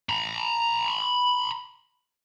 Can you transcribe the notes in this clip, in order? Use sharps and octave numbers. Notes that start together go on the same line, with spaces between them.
A#5 B5